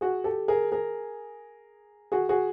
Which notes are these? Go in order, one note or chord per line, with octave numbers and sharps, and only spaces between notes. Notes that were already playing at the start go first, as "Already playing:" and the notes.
F#4 G#4
G4 A4
G#4 A#4
G#4 A#4
F#4 G#4
F#4 G#4